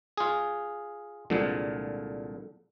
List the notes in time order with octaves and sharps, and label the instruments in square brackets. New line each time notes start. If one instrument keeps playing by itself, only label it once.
[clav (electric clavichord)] F4 G#4
[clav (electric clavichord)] C2 A#2 D3 [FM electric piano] F3 G#3